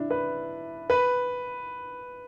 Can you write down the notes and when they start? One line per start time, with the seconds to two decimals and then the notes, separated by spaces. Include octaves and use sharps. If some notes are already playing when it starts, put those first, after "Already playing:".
Already playing: D4 E4
0.10 B4
0.90 B4